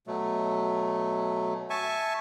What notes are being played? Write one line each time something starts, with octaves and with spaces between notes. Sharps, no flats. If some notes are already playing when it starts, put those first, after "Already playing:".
B2 F#3 A3
E5 G#5 A5 C#6